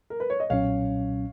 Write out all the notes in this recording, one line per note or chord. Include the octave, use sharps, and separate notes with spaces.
A#4
B4
C#5
D#5
B1 A#2 F#3 C#4 C#5 F5